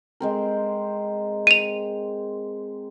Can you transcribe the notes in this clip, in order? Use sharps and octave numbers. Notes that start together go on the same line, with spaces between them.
G#3 C4 A#4
D#7 F7